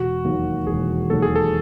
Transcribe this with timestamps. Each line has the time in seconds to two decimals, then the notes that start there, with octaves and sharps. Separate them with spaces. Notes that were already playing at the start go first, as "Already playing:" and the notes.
Already playing: E1 F#4
0.25 D#2 D#3 F#3 A#3
0.67 E1 G#4
1.10 D#2 D#3 F#3 A#3 A4
1.22 G#4
1.36 A4